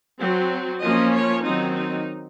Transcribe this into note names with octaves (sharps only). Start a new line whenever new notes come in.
F#3 C4
F3 A#3 C#4 D#5
C#5
D#3 F#3 C4 D#4
D#4